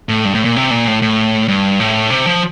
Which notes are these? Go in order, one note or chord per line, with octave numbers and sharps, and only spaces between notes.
A2
G2
A2
A#2
C3
A#2
A2
A2
G2
A2
C3
F3